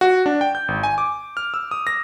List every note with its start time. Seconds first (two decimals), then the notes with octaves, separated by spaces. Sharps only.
0.01 F#4
0.26 D4
0.41 G5
0.55 G6
0.68 G#1
0.83 G#5
0.98 D6
1.37 F6
1.54 E6
1.71 D#6
1.87 A#6